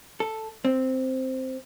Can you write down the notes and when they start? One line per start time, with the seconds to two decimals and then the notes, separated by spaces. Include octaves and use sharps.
0.20 A4
0.65 C4